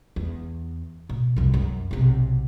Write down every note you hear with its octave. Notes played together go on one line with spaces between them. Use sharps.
E2
B2
C2 F2
F#2
B1 C3